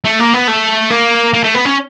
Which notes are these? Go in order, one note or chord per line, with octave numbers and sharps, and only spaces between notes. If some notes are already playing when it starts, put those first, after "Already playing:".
A3
A#3
B3
A3
A#3
A#3
A3
B3
C#4